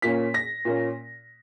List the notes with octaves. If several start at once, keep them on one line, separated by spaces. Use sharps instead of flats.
A#2 A#3 C#4 B6
A#6
A#2 A#3 C#4